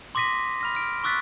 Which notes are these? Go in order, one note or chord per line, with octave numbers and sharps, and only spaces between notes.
C6 D6 D#6 A#6 B6 D#7
B5 F6 A#6
F6 D7
C#6 D6 E6 F#6 A6 B6